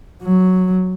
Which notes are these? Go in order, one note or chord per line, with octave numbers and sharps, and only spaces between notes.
F#3